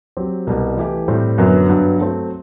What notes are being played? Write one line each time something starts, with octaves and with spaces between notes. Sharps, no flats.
F#3 C4 G4
C2 B2 G3
E3 A3 E4 G4
A2 G3 C4
F#2 D3 F#3 B3
G2 F#3 B3
F#3 A3 C4